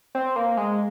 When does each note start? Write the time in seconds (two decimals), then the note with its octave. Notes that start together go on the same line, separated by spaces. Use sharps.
0.15 C4
0.36 A#3
0.57 G#3